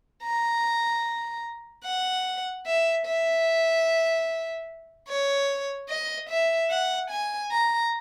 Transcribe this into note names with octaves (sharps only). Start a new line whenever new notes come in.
A#5
F#5
E5
E5
C#5
D#5
E5
F#5
G#5
A#5